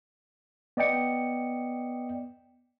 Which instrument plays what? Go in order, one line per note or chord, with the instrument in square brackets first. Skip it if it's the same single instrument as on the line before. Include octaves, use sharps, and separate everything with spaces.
[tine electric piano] B3 D5 D#5 G5 C#7